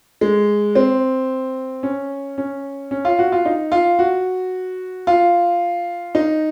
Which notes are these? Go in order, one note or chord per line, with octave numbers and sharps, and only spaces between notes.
G#3
C4
C#4
C#4
C#4
F4
F#4
F4
D#4
F4
F#4
F4
D#4